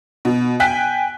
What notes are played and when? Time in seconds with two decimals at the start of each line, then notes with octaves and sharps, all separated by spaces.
0.25 B2
0.60 G5 G#5 F#6 B6